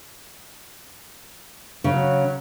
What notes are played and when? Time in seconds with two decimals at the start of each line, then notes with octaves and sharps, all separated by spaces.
1.84 C#3 F#3